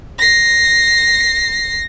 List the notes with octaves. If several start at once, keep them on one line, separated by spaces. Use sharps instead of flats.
A#6 C7